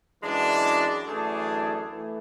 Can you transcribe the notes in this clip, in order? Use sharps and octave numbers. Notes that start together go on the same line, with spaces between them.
F#2 E3 G#3 D4
F#2 E3 A3 D4 G#4
E3 A3